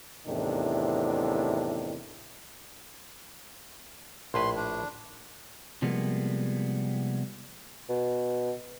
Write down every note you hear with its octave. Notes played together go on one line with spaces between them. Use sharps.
E2 A2 C3 D#3 D4
A#1 A2 B4 C6
D4
C3 F3 G3 G#3 A#3 B3
B2